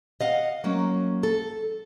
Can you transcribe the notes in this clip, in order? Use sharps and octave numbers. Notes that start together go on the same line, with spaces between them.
D#5 F5 F#5
F#3 A#3 C#4
A4